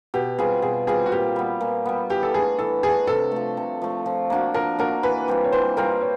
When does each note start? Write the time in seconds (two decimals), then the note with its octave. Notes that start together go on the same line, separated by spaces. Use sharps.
0.14 B2 G4
0.39 G3 C4 F4 G#4
0.62 B2 G#4
0.87 G3 C4 F4 G#4
1.06 F#4
1.12 A#2 G4
1.36 G3 B3
1.61 A#2
1.86 G3 B3
2.10 E3 G4
2.23 A4
2.34 A3 D4 G#4
2.59 E3 A4
2.83 A3 D4 G#4
3.07 C3 A4
3.32 F3 A3
3.57 C3
3.82 F3 A3
4.06 F3
4.30 A#3 D4 F#4
4.54 F3 A#4
4.79 A#3 D4 F#4 A#4
5.03 E3 B4
5.28 G3 C4 F4
5.44 C#5
5.52 E3 C5
5.77 G3 C4 F4 A#4
6.01 C#5